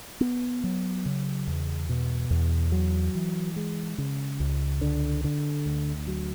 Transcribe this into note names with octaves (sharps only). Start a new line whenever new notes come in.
B3
F#3
C#3
E2
B2
E2
F#3
E3
G#3
C#3
C#2
D3
D3
D2
F#3